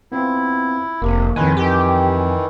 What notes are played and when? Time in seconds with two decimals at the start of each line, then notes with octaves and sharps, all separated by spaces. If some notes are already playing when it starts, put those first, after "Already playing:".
0.12 B3 C4 E4 F4
1.02 F1 C3 A#3
1.36 F2 A2 D#3 G#3 B4 G#5
1.57 D#3 E3 G4